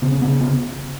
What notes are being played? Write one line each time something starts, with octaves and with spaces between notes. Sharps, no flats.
C#3 B3
C#4
C#3 B3
C#4
B3